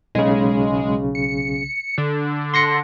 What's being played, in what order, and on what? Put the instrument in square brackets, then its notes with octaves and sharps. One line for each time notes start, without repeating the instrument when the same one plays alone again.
[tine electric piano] B1 C#3 [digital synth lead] G#3
[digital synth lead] C#7
D3
[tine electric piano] C6 A#6 C#7